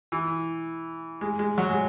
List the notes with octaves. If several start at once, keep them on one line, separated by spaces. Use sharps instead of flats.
E3
G#3
G#3
F#3
G#3